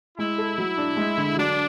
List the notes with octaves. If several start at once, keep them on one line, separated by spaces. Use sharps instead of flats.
G#3 E4
A4
F#3
D4
G#3
D3
F#3 D4